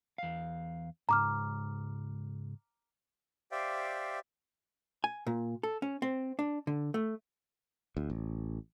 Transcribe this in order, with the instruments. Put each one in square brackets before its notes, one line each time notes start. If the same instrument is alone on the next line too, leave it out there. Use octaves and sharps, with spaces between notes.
[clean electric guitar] E2 F5
[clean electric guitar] C#2 G#2 [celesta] A#5 D6 F6
[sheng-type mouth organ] G4 C5 D5 E5 F5 G5
[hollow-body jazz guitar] G#5
A#2
A4
C#4
C4
D4
D3
A3
[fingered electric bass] D2
A1